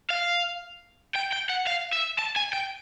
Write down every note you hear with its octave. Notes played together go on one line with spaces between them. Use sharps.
F5
G5
G5
F#5
F5
E5
A5
G#5
G5